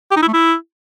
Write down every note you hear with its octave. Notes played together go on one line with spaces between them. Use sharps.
G4
D#4
E4
A3
E4